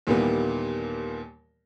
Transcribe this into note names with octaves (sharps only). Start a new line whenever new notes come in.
D#2 A#2 E3 G3 A#3 B3